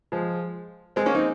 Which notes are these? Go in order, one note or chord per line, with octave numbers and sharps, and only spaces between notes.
F3 G#3
G#3 C4
A#3 C#4
C4 D#4